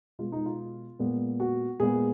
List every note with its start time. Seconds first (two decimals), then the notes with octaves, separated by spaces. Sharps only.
0.19 B2 G#3 B3 F4
0.32 D#4
0.46 F4
0.99 A#2 G#3 B3
1.40 F#4
1.80 A#2 G#3 B3 G#4